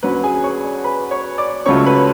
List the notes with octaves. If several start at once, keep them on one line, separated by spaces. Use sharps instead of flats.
D2 D3 F#3 C#4 B4 B5
G#4 G#5
C#5 C#6
D5
B4 B5
C#5 C#6
D5 D6
C#2 C#3 F#3 A3 F4 C#5 C#6
C#6
B4 B5